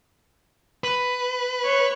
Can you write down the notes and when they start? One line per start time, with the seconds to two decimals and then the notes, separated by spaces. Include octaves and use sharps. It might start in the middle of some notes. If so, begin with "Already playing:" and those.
0.84 B4
1.62 C#5 C#6 F#6